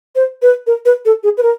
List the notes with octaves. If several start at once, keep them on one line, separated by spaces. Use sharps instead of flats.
C5
B4
A#4
B4
A4
G#4
B4
A#4